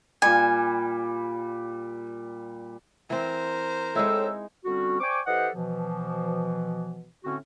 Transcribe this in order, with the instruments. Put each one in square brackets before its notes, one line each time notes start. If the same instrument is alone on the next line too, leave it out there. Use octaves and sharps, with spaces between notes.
[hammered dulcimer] A#2 G3 [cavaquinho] G#5
[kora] E3 C4 [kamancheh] A#4 C5
[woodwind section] A2 E6 [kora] G#3 D#4 E4
[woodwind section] D3 G3 C4 C#4 F#4
C5 D5 G5 G#5 C#6 D6
E3 G4 A4 C5 D#5 F#5
B2 E3 F3
A2 D3 C4 C#4 F#4